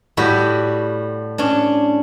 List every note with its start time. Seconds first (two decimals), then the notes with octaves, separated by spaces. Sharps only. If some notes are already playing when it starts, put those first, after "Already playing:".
0.17 A2 G3 F#4 G4
1.38 C#4 D4